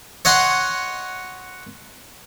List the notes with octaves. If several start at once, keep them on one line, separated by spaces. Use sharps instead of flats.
C#5 D#5 F#5 C6